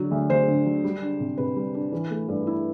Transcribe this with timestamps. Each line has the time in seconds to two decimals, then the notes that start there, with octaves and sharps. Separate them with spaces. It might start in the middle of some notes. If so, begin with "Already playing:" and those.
Already playing: D3 F#3
0.11 D2
0.30 D2 C5
0.48 D3
0.66 F#3
0.84 G3
1.02 D4
1.20 C3
1.38 C3 B4
1.56 G3
1.74 D4
1.92 E3
2.11 A3
2.28 G2
2.47 E4